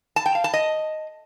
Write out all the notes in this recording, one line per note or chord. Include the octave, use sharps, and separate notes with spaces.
A5
G5
F5
A5
D#5